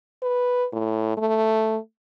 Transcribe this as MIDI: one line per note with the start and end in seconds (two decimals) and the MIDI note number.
0.22 0.66 71
0.73 1.14 45
1.17 1.78 57